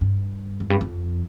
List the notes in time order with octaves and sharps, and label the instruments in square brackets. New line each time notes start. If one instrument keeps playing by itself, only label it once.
[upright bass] G2
F2
G2
F2